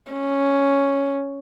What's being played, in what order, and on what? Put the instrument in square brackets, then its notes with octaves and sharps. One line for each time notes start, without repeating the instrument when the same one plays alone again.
[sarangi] C#4